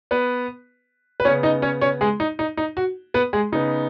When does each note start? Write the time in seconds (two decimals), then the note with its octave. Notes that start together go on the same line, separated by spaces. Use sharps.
0.11 B3 B4
1.20 B4
1.25 B3 C#4 C#5
1.28 C#3
1.43 D#4 D#5
1.62 C#4 C#5
1.81 C#4 C#5
2.01 G#3 G#4
2.20 D#4
2.39 D#4
2.57 D#4
2.77 F#4
3.14 B3 B4
3.33 G#3 G#4
3.52 C#3 B3 D#4